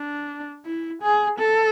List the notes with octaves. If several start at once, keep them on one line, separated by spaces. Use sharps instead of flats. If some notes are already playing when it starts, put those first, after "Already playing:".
Already playing: D4
E4
G#4
A4